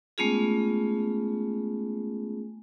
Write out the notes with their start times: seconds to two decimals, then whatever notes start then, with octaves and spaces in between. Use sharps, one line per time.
0.18 G#3 A3 B3 C#4 F4 G#4